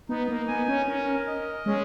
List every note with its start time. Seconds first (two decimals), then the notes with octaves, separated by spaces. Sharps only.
0.09 B3 D#4
0.28 A#3
0.48 B3 G#5
0.68 C#4
0.88 C#4 A#4
1.27 D#5
1.66 G#3 C#4